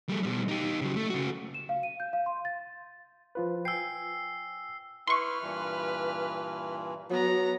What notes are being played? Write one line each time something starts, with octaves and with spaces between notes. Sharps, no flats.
G3 A3
B2 G3
D#4 G4
C#3 F#3
A3
C#3 F#4
E7
F5
D#7
G6
F5
C6
A6
F3 F4 B4
G5 G#5 E6 C7
E4 B4 C6 C#6 F6
G2 A#2 E3
F#3 B3 A#5